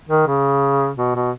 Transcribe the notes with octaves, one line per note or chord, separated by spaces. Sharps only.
D#3
C#3
B2
B2